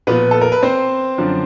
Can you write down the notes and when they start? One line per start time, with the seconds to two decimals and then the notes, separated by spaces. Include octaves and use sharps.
0.07 A#2 F3 B3 B4
0.31 A4
0.41 A#4
0.52 B4
0.62 C4 C5
1.18 F#2 D3 F3